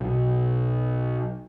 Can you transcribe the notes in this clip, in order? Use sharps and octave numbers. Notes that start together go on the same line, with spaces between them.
B1